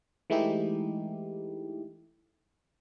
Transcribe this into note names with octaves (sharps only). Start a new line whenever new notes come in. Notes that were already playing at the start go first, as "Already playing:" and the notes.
E3 G#3 A3 D#4 E4 G4